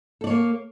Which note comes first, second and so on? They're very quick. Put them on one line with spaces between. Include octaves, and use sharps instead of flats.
A4 D5 C#5 A#3